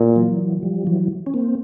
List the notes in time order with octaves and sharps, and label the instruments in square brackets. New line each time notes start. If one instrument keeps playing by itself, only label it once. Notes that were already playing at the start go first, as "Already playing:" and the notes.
Already playing: [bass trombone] A#2
[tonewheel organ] E3 F#3
F3 G3
E3 F#3
C#4
A#3 C4